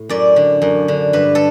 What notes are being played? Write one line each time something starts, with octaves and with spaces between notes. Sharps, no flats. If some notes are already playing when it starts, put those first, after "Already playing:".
Already playing: A2
F#2 D5
D3
F#2
D3
G2 B4
A4